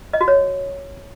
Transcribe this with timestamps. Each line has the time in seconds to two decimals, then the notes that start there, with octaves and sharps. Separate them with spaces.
0.13 D#5
0.21 F#4
0.28 C#5